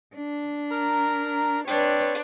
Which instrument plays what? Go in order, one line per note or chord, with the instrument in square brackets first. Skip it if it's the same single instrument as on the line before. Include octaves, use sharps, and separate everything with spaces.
[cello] D4
[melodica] A#4 A#5
[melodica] C4 G5 [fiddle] D4 [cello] B4 C#5